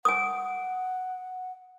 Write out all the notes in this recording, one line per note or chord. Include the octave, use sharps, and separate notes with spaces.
F#5 G#5 D#6